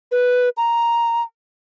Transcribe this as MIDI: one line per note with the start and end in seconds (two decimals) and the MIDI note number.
0.12 0.49 71
0.57 1.22 82